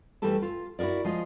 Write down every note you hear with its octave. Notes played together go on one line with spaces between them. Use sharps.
E3 G3 A3 G4 A4 A5
F4
E4 F#4 G#4 A#4 D5
F3 G#3 F4 D#5